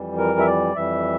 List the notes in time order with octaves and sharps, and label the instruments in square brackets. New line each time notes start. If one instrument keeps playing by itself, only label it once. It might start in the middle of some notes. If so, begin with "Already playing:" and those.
Already playing: [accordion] F2 E3 G3
A#4
E5
D5
F2 E3 G3 E5